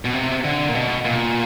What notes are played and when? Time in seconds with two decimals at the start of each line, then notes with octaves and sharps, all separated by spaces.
0.05 B2
0.14 C3
0.45 D3
0.69 A#2
0.75 B2
1.05 A#2